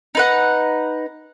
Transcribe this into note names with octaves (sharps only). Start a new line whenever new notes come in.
D#4 B4 F#5